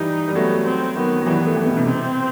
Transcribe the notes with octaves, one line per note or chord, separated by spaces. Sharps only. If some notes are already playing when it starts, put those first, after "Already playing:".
Already playing: E3 G3 D#4
G3
F#3 A3 B3
C4
D#3 F#3 B3
F#3
E3 G3 B3
A3
E3 G3
B2
C3
C3 C4